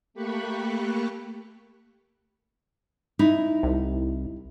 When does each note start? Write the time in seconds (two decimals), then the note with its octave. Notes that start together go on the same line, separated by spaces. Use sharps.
0.14 A3 A#3 G4 B5 C#6 F#6
3.19 D#4 E4
3.63 C2